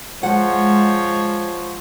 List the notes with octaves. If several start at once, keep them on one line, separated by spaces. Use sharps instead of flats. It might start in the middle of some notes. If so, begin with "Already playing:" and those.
F3 G#3 C5 C#5 F#5